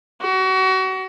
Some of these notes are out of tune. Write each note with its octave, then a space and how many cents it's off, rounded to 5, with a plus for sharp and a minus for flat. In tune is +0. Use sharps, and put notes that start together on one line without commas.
F#4 +30